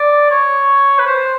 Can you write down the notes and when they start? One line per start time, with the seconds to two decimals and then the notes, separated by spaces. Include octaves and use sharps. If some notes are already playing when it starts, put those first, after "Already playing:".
Already playing: D5
0.31 C#5
0.99 B4
1.06 C5